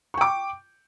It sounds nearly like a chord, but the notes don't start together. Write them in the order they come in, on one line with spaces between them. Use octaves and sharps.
C#6 G5 D6